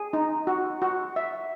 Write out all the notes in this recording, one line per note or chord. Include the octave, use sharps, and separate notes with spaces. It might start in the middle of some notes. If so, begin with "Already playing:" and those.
Already playing: G#4
D#4
F#4
F#4
E5